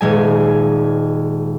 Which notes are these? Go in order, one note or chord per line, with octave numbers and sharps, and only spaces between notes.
D#1 G#3 G#5